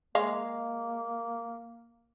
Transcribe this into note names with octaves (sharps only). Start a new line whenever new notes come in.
G#3 A#3 D#5 F5